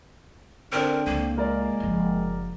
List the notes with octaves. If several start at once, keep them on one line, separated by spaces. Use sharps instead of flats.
D3 C4 D4 A#4
C#2 A#3
G#3 F4 A#4 D5
F#1 F3